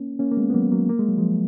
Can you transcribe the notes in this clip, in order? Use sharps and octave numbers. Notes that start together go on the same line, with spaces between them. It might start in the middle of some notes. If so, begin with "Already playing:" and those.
Already playing: A#3 C#4
A#3 C#4
A#3
G#3 B3
B3
F#3 A#3
F#3 A#3
A#3
G#3
F#3
F3 G#3